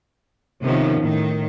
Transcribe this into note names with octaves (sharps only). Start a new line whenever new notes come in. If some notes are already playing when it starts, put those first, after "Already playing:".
C3 D#3 F3 B3 C#4
A2 D#3